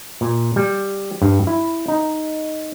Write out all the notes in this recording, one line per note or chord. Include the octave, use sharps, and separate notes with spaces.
A#2
G3
G2
E4
D#4